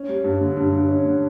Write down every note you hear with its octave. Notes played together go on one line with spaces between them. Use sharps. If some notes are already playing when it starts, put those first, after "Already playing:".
Already playing: C#4
G3
G2
D3
G2
G2
C#4
D3